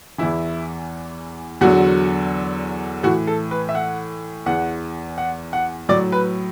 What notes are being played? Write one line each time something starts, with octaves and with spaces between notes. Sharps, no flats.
E2 E3 E4
E2 D3 F#3 F#4
A2 E3 F#4
A4
B4
E5
F#5
E2 E3 F#5
F#5
F#5
A2 F#3 D5
B4